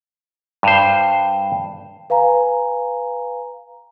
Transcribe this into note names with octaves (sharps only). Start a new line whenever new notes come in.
G2 C5
B4 F5 G#5 A#5